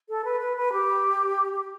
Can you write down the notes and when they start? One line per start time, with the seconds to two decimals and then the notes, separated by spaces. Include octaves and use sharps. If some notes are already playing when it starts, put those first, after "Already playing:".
0.09 A4
0.25 B4
0.40 B4
0.57 B4
0.73 G4
1.52 G4